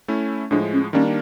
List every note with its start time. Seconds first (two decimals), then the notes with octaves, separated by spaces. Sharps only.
0.08 A3 C#4 E4
0.51 A2 F3 G#3 D4
0.72 C#4
0.93 D#3 G3 A#3 C#4 D4